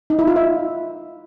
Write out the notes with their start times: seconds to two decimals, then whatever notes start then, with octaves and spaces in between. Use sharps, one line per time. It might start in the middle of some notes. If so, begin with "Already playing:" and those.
0.10 D#4
0.19 E4
0.27 F4
0.36 E5